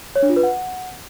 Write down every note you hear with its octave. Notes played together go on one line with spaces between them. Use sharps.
C#5
D4
F4
B4
F#5